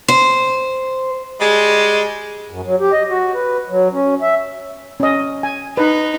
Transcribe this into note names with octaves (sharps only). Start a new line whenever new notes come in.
C5
G3 G#3
F#2
F#3
G4
D#5
F#4
B4
F#3
C#4
E5
C#4 D#5
G#5
D#4 B4